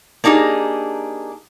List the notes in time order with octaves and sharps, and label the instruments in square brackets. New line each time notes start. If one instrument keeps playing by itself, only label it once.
[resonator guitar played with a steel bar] A#3 D4 D#4 G4 G#4